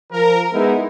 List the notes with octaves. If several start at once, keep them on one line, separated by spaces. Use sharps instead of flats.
F3 A#4
G#3 B3 D#4 E4